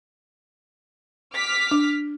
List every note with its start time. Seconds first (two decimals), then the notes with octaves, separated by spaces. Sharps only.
1.34 D6 F6 B6
1.71 D4